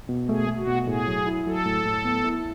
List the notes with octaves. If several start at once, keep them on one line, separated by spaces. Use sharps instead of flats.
B2
A3 G#4
A3
F#4
B2
A2 G#4
F#3
E4
F#3 A4
A2
A2
B3
E4